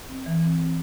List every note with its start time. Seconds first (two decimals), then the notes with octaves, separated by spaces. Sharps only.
0.09 C4
0.26 E3
0.43 C4
0.60 C4